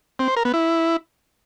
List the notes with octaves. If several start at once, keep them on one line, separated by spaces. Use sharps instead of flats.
C4
C5
A#4
B3
E4